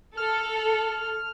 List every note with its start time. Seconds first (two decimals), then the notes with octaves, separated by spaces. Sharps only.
0.17 A4 F6